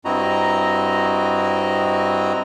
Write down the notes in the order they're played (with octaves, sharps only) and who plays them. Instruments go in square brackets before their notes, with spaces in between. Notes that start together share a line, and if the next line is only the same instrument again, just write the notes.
[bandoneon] G2 C4 E4 F#4 D#5 A#5